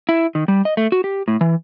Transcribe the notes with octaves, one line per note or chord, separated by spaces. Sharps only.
E4
D#3
G3
D#5
A3
F#4
G4
A2
E3